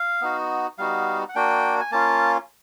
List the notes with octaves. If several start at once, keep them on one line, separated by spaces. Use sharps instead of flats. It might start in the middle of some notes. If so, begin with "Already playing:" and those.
Already playing: F5
B3 D#4 F#4
G3 B3 D#4 F#4 F5
F#5
A#3 D4 F#4 G5
G#5
A#3 C#4 F4 A5